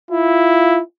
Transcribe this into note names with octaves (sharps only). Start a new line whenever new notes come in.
E4 F4